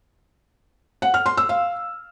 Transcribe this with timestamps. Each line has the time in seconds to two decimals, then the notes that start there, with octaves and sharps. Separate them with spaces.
1.02 F#5
1.14 F6
1.26 C6
1.37 E6
1.49 F5